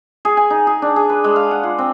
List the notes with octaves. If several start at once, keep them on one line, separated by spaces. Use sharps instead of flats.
G#4
G#5
D#4
G#4
D4
G#4
B4
G#3
F5
F#5
F4
C4